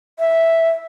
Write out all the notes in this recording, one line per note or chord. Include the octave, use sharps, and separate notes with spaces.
E5